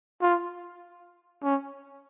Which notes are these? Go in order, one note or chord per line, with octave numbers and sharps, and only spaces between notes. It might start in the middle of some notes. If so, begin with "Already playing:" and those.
F4
C#4